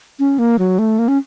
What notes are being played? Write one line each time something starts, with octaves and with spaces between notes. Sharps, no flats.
C#4
A#3
F#3
A3
A#3
C#4